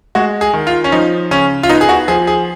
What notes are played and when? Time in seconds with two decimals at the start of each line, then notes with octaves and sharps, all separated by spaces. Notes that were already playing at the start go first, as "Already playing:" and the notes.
0.15 G#3 F#4
0.41 G#4
0.53 D#3
0.67 F4
0.84 C#4
0.92 F3 D#4
1.31 C#3 C#4
1.63 F4
1.69 B3 D#4
1.81 G#4
1.89 F#4
2.08 F3 G#4
2.27 G#4